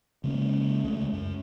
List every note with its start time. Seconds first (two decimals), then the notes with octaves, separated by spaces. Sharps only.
0.24 C#3 G#3 A#3 C#4
0.84 C#2 C#3 G#3 A3
1.13 F#2